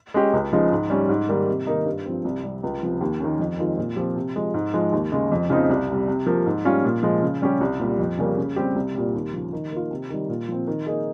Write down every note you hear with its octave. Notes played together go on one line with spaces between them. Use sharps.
G#3 C#4 G4
C#2
C#3 F3 G#3 D#4
G#2
G3 C#4
G#2
D#3 G3 A#3
C3
D#3 A#3 D#4
G2
F3 C4
C2
C3 G3
C#2
C3 F3
D#2
D#3 A#3 C#4
F2
D#3 G#3 C4 F4
A#2
F3 C4 G4
C3
F3 G#3
G#2
F3 G#3
D#2
C#3 G#3
F2
C#3 F3 C4 D#4
C2
C3 G3
C3
F3 A#3
G#2
G3 C#4 F4
A#2
F3 G#3
C#3
G3 C#4 G4
C2
A#2 G3
F2
C#3 G3 A#3 C#4
C#3
G3 C4 G4
C2
A#2 G3
D#2
C#3 F3
D#3
A#3 F4
C3
D#3 G3
A#2
F3 C4
D#3
A#3 D#4 G#4